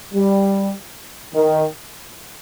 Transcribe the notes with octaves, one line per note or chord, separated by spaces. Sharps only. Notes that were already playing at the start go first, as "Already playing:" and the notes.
G3
D#3